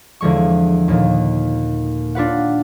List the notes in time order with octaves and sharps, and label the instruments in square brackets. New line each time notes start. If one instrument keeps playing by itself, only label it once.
[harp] E2 D3 F3 G#3 C#6
D#2 A#2 D#3
D4 F4 B4 F#5